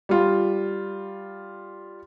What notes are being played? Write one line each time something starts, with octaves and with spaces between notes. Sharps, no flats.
G3 F4